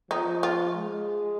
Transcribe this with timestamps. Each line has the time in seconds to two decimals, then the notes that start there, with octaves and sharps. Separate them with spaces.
0.10 F3 D#4
0.43 F4
0.76 G#3